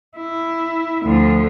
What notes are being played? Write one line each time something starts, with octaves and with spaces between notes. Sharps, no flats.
E4
D2 F3